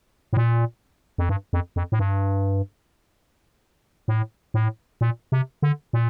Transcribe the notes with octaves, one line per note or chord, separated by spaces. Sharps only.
A2
A#2
F2
G2
F2
F2
A2
G2
A2
A2
A#2
C3
D3
A#2